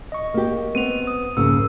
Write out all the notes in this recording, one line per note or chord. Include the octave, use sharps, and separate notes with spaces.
D#5 C#6
A#3 G4
B3 C4 D#7 F7
D#6
C2 F2 G#2 C#3 A#3 E6